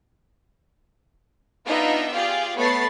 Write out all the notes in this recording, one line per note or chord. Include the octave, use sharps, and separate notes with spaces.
B3 D4 D#4 F4 D#5 E5
F4 G4 G#4 D5
A3 B3 C#5 B5 A6 C7